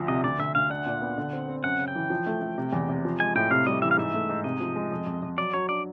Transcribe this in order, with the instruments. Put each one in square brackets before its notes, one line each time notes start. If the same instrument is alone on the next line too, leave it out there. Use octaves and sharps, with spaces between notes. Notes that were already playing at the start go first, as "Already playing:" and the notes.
Already playing: [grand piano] D2 F3
[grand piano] C3 [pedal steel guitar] D#5
[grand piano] D2 [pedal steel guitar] D5
[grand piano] D2 [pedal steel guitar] E5
[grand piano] D2 [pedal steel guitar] F5
[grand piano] D4 [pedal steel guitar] F#5
[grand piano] A#2
B3
D3
C4
C4
[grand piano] F#2 [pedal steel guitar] F#5
[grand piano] C#3
[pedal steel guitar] G5
[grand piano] E3
F3
A3
A3
C3
E2
C3
F3
[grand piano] G#3 [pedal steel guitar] G#5
[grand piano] A2 [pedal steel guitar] G5
[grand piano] C3 [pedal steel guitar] F5
[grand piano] G3 [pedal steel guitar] D#5
[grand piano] E3 [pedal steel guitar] E5
[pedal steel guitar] F5
[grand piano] G#2 [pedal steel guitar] E5
[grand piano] A3
G#2
[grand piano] C3 [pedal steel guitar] D#5
[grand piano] F3
G#3
F2
F2
F2
[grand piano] F#3 [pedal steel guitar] D5
[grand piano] F#3 [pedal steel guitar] C#5
[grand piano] D4 [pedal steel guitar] D5